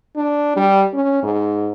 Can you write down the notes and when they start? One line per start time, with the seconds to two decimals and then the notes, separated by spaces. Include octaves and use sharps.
0.16 D4
0.56 G3
0.94 C#4
1.23 G#2